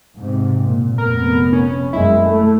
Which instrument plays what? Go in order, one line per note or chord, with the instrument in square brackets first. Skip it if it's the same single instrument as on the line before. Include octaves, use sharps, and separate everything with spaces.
[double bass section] G#2 C3
A#2
[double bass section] F1 B3 [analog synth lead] A#4
[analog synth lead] C#4
[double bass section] F#2 G#3 [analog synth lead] E4
[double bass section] A3